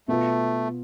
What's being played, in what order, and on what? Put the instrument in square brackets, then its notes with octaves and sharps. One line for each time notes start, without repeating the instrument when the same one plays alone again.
[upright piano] B2 B3 F4 [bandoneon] A3